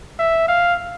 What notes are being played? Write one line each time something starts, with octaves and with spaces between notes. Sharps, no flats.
E5
F5